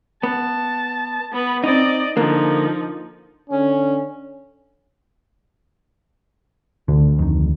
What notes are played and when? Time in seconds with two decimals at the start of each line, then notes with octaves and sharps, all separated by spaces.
0.23 B3 A5
1.33 B3 B4
1.64 C4 D#4 D5 D#5
2.17 D3 F3 A#3 D#4
3.50 D3 C#4
6.88 D2 D3
7.19 F2 D#3